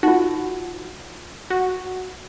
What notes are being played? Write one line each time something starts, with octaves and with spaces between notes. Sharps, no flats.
D#4 F4 F#4
F#4